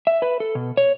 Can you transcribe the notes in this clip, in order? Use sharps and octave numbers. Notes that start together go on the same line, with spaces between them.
E5
B4
A4
B2
C#5